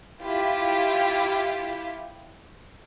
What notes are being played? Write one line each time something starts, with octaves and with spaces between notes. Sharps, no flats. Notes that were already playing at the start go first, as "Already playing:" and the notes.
E4 F4 G4